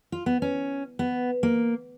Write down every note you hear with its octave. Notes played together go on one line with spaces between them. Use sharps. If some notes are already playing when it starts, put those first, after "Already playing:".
F4
B3
C#4
B3
A#3